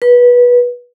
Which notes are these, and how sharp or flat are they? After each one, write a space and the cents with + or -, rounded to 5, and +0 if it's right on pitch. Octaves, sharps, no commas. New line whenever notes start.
B4 -20